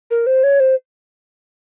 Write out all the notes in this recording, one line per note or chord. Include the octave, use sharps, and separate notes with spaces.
A#4
C5
C#5
C5